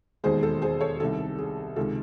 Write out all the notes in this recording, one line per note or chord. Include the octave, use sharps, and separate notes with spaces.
E1 D#2 D#3 G#3 G#4 C5
A4
G#4 C5
A4 C#5
C2 C3 D#3 A4
G#4
C#2 C3 D#3 G#3 A4